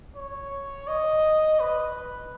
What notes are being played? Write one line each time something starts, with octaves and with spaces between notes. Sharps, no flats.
C#5
D#5
B4